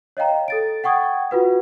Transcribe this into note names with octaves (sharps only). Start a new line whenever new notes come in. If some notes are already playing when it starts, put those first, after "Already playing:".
C#5 D#5 F5 G5 A#5
A4 A6 D7
F#5 G5 C#6 D#6 G#6
F4 F#4 B4 F#5